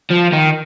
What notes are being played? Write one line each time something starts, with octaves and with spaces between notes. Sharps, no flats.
F3
D#3